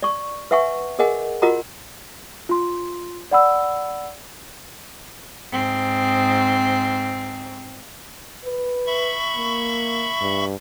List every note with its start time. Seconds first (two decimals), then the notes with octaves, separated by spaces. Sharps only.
0.03 D5 C#6
0.51 B4 E5 F#5 G#5 C#6
0.99 G#4 A#4 D#5 F#5 G#5
1.42 F4 F#4 A#4 D#5 F#5 A#5
2.49 F4 C6
3.31 D5 F#5 B5 E6
5.51 G#2 C4
8.45 B4
8.86 E5 B5 C#6
9.37 A#3
10.21 G2